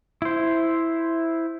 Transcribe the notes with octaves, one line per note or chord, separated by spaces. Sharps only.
E4 C5